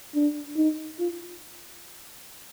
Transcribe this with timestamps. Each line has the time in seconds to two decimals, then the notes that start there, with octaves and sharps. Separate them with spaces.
0.15 D4
0.56 D#4
0.99 F4